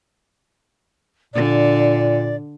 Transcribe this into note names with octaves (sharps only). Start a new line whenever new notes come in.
A#2 D3 D5